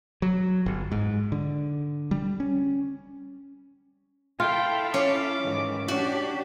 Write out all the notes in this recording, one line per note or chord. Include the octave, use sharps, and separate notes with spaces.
F#3
G1
G#2
D3
G3
C#4
E4 F4 A4 F5 G5
C#4 D6
G#2 D#3 E3
C#4 D4 F#4 G4